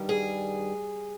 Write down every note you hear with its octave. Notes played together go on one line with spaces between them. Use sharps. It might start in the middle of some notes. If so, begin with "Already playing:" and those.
Already playing: G2 D#3 G3
G#4